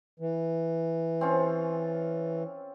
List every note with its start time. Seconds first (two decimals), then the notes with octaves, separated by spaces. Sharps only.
0.20 E3
1.21 C4 C#4 F4